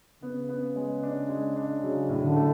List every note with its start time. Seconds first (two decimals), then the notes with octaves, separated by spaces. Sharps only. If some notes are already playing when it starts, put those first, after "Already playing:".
0.22 C#3 B3
0.49 B3
0.76 G#3
1.03 D4
1.29 G#3
1.56 D4
1.83 C#3 F#3
2.09 A2
2.23 D3
2.36 A3